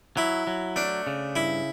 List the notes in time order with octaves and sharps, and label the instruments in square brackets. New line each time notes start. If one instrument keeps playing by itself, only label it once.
[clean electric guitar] F#3 [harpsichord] E4
[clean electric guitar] F#3
[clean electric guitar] A3 [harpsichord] D4
[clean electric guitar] C#3
[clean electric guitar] G2 [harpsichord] E4